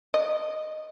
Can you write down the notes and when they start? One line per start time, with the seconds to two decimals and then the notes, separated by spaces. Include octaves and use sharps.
0.14 D#5